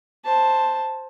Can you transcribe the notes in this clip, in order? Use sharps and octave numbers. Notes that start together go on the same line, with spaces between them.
C5 A5